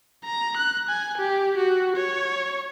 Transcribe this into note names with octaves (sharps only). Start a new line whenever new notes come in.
A#5
F#6
G#5
G4
F#4
C#5